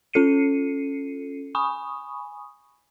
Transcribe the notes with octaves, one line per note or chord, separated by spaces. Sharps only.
C#4 F4 A4 C7 C#7 D#7
G#5 B5 C#6 D#6